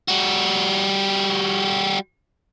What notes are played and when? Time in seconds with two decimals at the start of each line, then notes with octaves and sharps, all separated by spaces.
0.08 G3 F#4